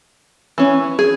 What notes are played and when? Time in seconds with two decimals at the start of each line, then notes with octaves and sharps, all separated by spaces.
0.58 E3 C#4
0.99 G#4